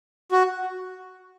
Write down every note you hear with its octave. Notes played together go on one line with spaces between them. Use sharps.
F#4